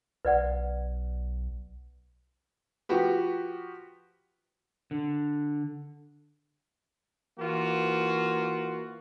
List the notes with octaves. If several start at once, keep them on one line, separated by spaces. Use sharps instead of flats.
B1 B4 D5 F#5
F3 F#4 G4 B4
D3
E3 A#3 F4 F#4